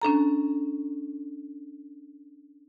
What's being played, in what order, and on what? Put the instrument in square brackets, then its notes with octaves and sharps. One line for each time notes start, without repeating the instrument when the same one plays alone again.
[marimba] C#4 D4 A4 A#5